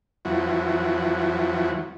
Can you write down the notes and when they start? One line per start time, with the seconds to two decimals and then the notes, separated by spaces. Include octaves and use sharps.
0.25 F2 E3 F#3